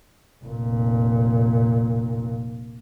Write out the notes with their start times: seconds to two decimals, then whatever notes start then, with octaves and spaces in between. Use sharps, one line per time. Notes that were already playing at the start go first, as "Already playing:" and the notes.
0.44 F1 A#2